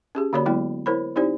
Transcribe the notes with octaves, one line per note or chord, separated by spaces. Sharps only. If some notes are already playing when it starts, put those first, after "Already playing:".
C#4 G4 G#4
D3 A#3 F#4 C#5 D5 B5
F#3 G#3 B3 E4 G5
E4 A#4 C5 C#5 B5
C4 D#4 E4 G4 C5 D5